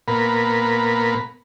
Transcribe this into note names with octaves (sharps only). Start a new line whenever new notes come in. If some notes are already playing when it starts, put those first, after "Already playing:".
A#2 B3 A#4 B5